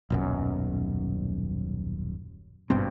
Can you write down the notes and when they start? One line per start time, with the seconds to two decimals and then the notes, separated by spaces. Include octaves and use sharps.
0.10 D#1 B1 F#2
2.70 G#1 G2 B2 C4